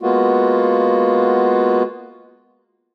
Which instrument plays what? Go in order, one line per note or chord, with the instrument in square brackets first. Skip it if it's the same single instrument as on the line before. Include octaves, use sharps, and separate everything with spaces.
[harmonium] G#3 A#3 B3 F4 F#4